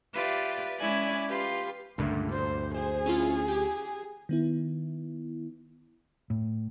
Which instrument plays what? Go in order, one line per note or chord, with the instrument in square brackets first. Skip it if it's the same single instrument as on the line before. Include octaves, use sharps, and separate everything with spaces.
[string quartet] F4 G4 B4 D5 E5
G#3 C#4 E4 D5 G#5 F#6
F4 G4 B4 C6
[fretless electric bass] C#2 D3 A3 [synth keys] G2 A#2
[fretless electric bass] D2 [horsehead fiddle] C5
[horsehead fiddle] G#4 [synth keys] C5
[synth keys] C#4 E4 F4
G4
[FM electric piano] D#3 B3 E4
[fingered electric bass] A2